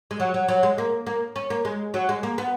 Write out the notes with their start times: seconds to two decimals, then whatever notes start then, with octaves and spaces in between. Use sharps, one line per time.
0.11 G#3
0.20 F#3
0.34 F#3
0.48 F#3
0.63 G#3
0.78 A#3
1.07 A#3
1.36 C#4
1.50 A#3
1.65 G#3
1.94 F#3
2.09 G#3
2.23 A#3
2.38 B3